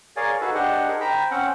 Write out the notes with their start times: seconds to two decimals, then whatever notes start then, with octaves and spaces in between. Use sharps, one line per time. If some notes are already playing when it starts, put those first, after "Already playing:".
0.16 G#4 A#4 C#5 D5 F5 G#5
0.41 D#4 F#4 G#4 A4 B4
0.54 D4 G4 C5 D#5 F#5
0.88 D#4 G#4 A#4
1.00 C5 G5 A#5 B5
1.31 C4 C#4 C5 F#5